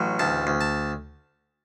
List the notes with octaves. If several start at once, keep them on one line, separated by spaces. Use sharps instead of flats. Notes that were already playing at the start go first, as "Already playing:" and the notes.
Already playing: A1 F#3
D2 A5
D2
A5